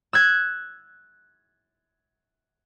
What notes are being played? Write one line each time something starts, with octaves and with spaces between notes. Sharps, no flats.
E6 F#6 G#6